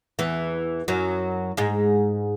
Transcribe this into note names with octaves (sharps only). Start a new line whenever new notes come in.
E2 E3
F#2 F#3
G#2 G#3